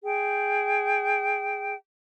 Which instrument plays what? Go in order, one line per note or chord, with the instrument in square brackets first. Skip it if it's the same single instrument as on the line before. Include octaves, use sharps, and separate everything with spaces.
[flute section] G#4 G5